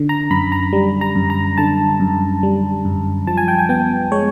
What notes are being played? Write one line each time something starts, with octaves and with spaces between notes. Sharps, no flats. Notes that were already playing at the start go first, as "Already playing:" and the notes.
Already playing: D3
A#5
F#2 B5
A#5
G3
A#5
F#2
A#5
D3 A5
F#2
G3
F#2
F3 A5
G#5
G5
G#5
B3 G5
G#3 C#5